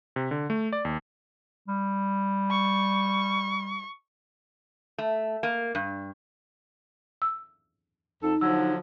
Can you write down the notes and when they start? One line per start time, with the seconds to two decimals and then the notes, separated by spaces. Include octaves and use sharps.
0.16 C3
0.31 D3
0.50 A3
0.73 D5
0.85 D#2
1.68 G3
2.51 C#6
4.98 A3
5.43 A#3
5.75 G2
7.22 E6
8.22 F2 D#4 A4
8.41 D3 F3 F#3 E6